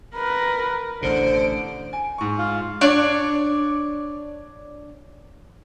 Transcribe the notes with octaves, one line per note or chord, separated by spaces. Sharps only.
A#4 B4
A1 B2 D3 C5 D7
G#5
G#2 C#6
F4
D4 C#5 D5